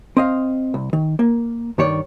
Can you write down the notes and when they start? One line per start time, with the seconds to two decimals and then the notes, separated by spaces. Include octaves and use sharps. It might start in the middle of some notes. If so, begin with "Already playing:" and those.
0.17 C4 D#5 F5
0.74 C2
0.93 D#3
1.19 A#3
1.78 G2 D#3 C#5 D5